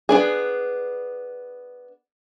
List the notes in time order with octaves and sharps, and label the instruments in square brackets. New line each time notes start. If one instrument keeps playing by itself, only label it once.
[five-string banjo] B3 D4 G#4